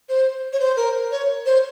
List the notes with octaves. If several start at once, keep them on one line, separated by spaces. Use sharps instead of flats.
C5
C#5
C5
A#4
C#5
C5